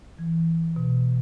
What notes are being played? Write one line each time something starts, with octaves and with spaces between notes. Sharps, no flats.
E3
B2